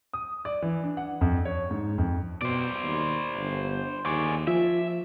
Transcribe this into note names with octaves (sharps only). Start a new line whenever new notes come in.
D#6
D5
E3
D4
F#5
F2
C#5
G#2
F2
B2 C5 D5
D#2
G1
D#2 G#4 D5 C#6
F3 F4 E5